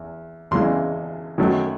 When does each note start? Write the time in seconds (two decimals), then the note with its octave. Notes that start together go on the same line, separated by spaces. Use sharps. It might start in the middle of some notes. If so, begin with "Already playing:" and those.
Already playing: E2
0.51 E2 C#3 E3 G#3 C6
1.38 F#2 D#3 F#3 A3